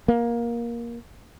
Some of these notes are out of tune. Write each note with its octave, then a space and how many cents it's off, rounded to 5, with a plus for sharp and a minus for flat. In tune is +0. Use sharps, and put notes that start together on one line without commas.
A#3 +15